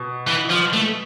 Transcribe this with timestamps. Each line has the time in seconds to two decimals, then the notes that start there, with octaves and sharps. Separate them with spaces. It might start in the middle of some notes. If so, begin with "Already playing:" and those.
Already playing: B2
0.27 E3
0.50 F3
0.73 A3